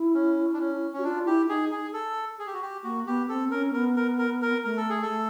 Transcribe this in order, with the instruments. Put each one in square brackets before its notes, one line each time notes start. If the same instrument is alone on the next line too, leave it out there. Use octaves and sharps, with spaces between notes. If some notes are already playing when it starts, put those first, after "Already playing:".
Already playing: [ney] E4
[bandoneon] C#4
D4
C#4
[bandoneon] C#4 [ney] F#4
[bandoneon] D4 [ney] F4
[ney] E4 [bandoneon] G4
[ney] D#4 [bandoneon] G#4
[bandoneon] G#4
A4
G#4
G4
F#4
G4
[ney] A#3 [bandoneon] F#4
[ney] B3 [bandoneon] G4
[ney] C4 [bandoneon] A4
[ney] C#4 [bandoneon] A#4
[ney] B3 [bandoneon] A#4
[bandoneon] A#4
A#4
A#4
[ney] A3 [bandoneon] A#4
[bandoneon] A4
G#4
A4
[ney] A3